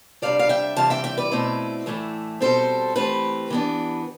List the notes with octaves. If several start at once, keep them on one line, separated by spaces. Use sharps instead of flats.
C3 E3 G3 D4 D5 F5
F5
E5 G5
C3 E3 G3 F5 A5
E5 G5
E5 G5
B4 D5
B2 A3 C4 E4
A2 E3 A3 E4
B2 G3 C4 A4 C5
E3 A3 C4 G4 B4
E3 B3 D4